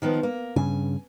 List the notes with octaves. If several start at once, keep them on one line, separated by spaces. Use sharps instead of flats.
D#3 F3 B3
A#3
G2 C#3 G#5